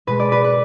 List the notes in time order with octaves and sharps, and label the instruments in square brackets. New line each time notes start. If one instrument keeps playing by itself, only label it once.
[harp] B2 G#3 B4
D5
B4
B4